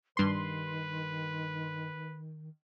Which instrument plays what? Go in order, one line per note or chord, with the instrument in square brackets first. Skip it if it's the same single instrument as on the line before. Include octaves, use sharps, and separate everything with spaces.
[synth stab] G2 C6 [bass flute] D#3 [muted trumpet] B4